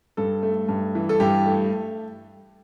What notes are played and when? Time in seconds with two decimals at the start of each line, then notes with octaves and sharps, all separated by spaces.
0.17 G2 A4
0.43 A3
0.69 G2
0.95 E3
1.09 A4
1.20 G2 G4
1.46 A3